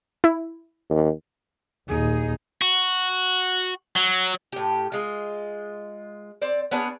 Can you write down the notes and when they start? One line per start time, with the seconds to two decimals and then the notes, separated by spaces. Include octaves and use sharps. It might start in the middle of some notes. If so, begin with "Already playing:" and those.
0.24 E4
0.90 D#2
1.88 D#2 A#2 D#4 G#4
2.62 F#4
3.96 F#3
4.52 A2 G4
4.92 G#3 F4
6.42 C4 D5
6.71 B3 C#4 D4 G#4